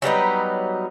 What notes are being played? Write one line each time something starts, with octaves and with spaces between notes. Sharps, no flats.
F#3 G3 B3 D#4